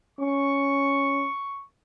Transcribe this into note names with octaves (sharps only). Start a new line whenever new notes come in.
C#4 C#6